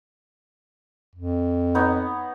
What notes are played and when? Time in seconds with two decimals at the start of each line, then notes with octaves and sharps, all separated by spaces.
1.15 F2
1.75 B3 D#4 C#5